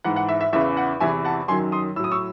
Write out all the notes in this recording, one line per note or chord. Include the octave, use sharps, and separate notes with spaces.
G#2 E3 F#5
F#5
E5
E5
E2 C#3 E3 E5
F#5
E2 C3 E3 E5 G#5
F#5 A5
F#2 D#3 F#3 G#5 C6
C6 D#6
A2 F#3 D#6 E6
C#6 E6